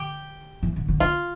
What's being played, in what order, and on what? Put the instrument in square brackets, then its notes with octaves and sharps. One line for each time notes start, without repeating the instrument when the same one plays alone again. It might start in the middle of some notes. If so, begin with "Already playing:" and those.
Already playing: [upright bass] D3 [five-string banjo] G4
[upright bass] E3
D3
D3
[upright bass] D3 [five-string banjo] F4